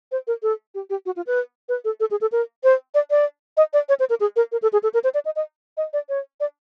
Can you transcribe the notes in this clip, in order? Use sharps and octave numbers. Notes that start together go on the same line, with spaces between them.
C5
A#4
A4
G4
G4
F#4
F4
B4
B4
A4
A4
G#4
A4
A#4
C5
D5
D5
D#5
D5
C#5
C5
A#4
G#4
A#4
A#4
A4
G#4
A4
A#4
C5
D5
D#5
D#5
D#5
D5
C#5
D5